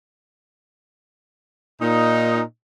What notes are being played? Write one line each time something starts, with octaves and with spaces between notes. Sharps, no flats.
A#2 D#4